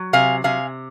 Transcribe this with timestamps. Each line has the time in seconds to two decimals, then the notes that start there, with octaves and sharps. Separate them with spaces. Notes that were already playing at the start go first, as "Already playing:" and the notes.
Already playing: F#3
0.13 C3 F5 G#5
0.44 C3 F5 G#5